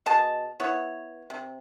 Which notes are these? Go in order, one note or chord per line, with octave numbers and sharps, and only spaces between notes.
B2 G#4 D#5 A5
B3 E4 C#5
C3